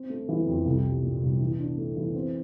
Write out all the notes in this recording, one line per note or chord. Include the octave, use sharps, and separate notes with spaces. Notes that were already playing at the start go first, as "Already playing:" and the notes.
Already playing: C4
A3
E3
F2
C2
G3
A#2
C2
E3
D4
A3
E3
C4